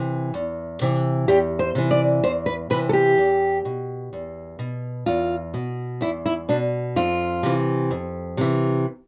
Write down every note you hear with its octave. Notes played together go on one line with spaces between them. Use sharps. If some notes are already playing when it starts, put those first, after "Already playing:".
Already playing: C3 E3
E2
C3 E3
E2 G4
C5
C3 E3
D5
E2 C5
B4
C3 E3 B4
A4
G4
E2
B2
E2
B2
E2 F4
B2
E2 E4
E4
B2 D4
F2 F4
C3 E3
F2
C3 E3